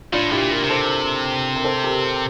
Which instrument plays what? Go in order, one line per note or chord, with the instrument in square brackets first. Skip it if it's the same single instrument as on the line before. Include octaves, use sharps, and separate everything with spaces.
[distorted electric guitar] A2 [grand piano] D4 F4
[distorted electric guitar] A2 [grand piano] E4 G4
[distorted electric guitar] A#2
[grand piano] G4 A#4
[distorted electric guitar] C3
[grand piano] A4 C5
A#4
A4 C5
G4 A#4